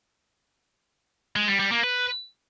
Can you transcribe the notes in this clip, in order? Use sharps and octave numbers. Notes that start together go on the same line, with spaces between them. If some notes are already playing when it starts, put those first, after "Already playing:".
G#3
G3
G3
A#3
B4